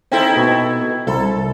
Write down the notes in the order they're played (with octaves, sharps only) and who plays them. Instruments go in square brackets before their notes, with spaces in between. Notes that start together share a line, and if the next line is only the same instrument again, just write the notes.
[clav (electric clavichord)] C4 [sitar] D#4 E4 A4
[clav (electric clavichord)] B2
[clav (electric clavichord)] C2 [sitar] A4